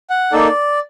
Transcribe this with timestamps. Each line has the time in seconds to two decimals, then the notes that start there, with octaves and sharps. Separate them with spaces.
0.10 F#5
0.32 A#3 D#4 A4 D5